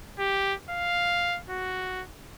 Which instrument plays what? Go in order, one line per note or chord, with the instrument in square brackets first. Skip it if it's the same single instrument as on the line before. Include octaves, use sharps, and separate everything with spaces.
[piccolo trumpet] G4
F5
F#4